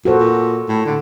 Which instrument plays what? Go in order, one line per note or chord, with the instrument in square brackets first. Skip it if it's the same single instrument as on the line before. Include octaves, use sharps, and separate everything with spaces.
[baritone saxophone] A#2 [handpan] F#4 A4 C5
[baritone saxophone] A#2
A2
D3